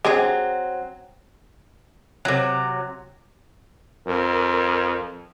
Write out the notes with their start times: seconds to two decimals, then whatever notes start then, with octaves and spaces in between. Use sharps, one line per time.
0.05 F#3 G#3 C4 G4 G#4
2.25 C3 F#3
4.07 F2 A#4